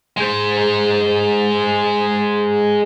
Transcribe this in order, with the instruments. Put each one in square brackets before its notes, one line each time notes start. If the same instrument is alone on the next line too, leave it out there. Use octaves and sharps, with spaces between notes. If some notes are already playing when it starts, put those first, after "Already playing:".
[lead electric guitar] G#3 C5